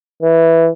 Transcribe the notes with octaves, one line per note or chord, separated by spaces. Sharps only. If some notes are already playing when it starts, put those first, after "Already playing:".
E3